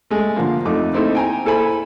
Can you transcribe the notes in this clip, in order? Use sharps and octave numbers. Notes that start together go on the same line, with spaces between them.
G#3 A3
D3 F3 A#3
F2 A3 D#4 D6
A3 C4 D#4 E4 A4
G5 G#5 A#5
E4 A4 C5 G#5 B5